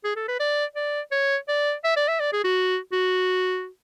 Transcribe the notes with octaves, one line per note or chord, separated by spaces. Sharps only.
G#4
A4
B4
D5
D5
C#5
D5
E5
D5
E5
D5
G#4
F#4
F#4